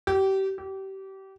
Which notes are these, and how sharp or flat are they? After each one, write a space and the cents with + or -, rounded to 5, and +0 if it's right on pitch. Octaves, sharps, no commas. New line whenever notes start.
G4 -30
G4 -30